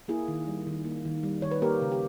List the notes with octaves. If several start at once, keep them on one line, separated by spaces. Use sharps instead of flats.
A#3 E4 G#4
D#3
G3
D#3
A#3
D#3
G3
D#3 C#5
B4
A#3 G4 A#4
C#3
G4